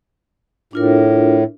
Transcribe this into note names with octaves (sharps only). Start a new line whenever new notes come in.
A2 D4 F4 A#4